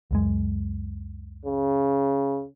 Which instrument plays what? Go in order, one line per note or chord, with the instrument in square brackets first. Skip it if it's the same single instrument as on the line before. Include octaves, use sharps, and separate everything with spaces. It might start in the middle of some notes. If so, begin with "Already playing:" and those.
[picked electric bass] C#2 F#2 G#3
[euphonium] C#3